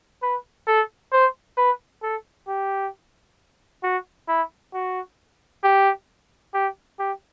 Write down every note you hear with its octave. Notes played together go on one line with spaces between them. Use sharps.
B4
A4
C5
B4
A4
G4
F#4
E4
F#4
G4
G4
G4